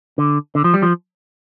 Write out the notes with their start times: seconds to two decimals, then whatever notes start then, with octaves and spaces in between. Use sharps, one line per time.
0.18 D3
0.55 D3
0.64 F3
0.74 G3
0.83 F3